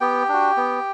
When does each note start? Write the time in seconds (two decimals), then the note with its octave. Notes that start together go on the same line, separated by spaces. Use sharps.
0.01 B3 G4 G5
0.29 D4 F#4
0.57 B3